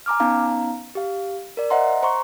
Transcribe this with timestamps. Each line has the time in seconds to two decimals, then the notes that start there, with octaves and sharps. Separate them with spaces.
0.06 G#5 A#5 D6 F6
0.20 B3 C#4 D#4 F5 A#5
0.95 G4 F5
1.57 A#4 D5
1.70 C5 D#5 E5 F#5 A#5 C6
2.03 C5 A#5 C6 C#6